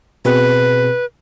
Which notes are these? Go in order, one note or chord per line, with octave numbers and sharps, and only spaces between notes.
B2 C4 G#4 B4